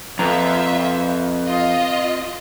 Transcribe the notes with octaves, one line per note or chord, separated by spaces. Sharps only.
F2 C4 F4 B4 E5 A#5
F4 D#5